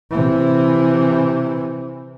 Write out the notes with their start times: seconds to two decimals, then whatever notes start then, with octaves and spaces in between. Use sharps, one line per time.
0.11 C3 E3